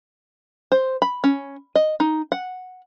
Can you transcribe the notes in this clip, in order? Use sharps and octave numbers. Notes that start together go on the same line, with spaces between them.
C5
B5
C#4
D#5
D#4
F#5